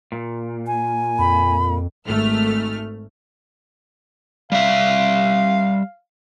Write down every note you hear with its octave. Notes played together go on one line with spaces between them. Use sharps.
A#2
G#5
F2 B5
G#1 A3 F6
G3 E5 F5